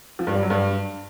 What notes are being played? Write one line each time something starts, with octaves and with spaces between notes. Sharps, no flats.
F3
G2
G3
F#3
G2